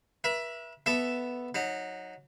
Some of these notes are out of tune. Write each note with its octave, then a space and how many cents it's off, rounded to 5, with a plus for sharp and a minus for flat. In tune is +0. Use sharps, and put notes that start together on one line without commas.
B4 -40 E5 +10
B3 +0 A4 +0 E5 +0
F#3 -15 D#4 +0